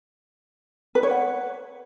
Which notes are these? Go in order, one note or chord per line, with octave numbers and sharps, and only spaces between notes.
B4
C#5
F#5